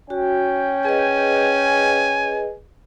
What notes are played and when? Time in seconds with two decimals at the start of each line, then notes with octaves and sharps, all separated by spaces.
0.10 C#4 F#4 G5
0.85 G#4 B4 D#5 G#5